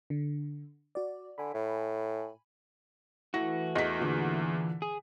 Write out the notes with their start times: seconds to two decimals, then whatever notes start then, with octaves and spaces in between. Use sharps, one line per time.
0.10 D3
0.95 F#4 D5
1.38 D3 G#5 B5
1.54 A2
3.34 E3 A3 F#4 A#6
3.75 E2 D#5 B6
3.99 A#2 D3
4.82 G#4